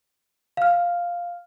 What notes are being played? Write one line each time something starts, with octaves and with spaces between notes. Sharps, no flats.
F5 F6